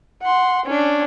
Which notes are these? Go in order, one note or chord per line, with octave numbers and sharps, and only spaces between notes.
F#5 C6
C#4 D4